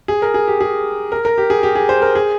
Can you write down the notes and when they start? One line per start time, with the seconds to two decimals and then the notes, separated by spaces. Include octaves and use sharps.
0.08 G#4
0.22 A#4
0.34 G#4
0.48 G4
0.61 G#4
1.12 A#4
1.25 A#4
1.38 G4
1.50 G#4
1.63 G4
1.76 G#4
1.89 C5
2.02 A#4
2.15 G#4